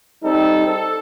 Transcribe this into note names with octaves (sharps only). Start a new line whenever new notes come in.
G3 C4 D#4 A4
A4